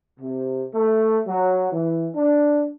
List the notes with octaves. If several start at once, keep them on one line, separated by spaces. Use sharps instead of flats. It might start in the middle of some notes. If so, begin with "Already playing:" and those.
C3
A3
F#3
E3
D4